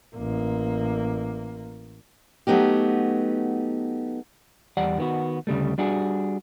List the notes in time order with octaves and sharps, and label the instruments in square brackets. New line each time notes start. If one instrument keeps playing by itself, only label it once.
[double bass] A1 A#3
[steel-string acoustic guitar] F#3 A3 B3 D#4 G4
[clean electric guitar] E2 G3 D5 F#5
D#3 B3 F#4
D2 C#3 G3 A3
G3 D4 F#4 G#4